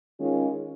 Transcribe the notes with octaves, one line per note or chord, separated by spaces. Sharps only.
D#3 G#3 C#4 F4